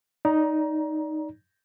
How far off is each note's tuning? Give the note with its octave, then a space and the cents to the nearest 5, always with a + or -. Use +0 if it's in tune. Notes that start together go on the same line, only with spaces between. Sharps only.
D#4 +0 D5 -20 A#5 +20